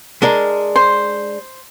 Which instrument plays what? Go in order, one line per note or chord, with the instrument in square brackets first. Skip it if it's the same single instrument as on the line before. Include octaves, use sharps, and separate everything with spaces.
[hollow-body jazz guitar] G#3 D4 A#4
[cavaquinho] C5